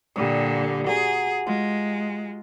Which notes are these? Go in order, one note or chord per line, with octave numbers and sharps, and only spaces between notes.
A#2 D3 G3 D#6
F#4 G#4 G5 A#5
G#3 F4